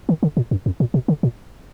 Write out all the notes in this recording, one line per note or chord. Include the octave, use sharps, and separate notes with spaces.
D#3
D3
A#2
F#2
F2
A#2
B2
D3
A#2